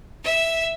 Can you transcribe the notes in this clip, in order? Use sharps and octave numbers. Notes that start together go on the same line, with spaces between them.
E5